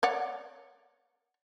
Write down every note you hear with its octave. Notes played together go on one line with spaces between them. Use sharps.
C#5 D5 F#5